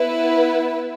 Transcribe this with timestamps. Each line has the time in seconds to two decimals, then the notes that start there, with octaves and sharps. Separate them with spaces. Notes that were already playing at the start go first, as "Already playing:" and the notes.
Already playing: B3 E4 B4